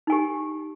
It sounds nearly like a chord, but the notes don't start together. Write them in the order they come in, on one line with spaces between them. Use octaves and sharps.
D#4 G#5 G4